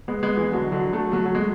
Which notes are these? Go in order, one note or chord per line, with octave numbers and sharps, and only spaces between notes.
G#3 B3
G#3 B3
E3 G#3
D3 F#3
D3 F#3
F#3 A3
F#3 A3
F#3
G#3